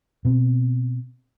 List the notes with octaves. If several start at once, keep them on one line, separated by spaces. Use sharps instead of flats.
B2 C4